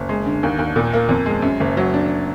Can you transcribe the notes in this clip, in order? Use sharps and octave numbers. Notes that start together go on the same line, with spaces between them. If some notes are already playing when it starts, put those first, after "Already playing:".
Already playing: F#1
G#3
D3
D#2
D#2
A#2
A#3
F2
G#3
F#2
F#1
F#3
D4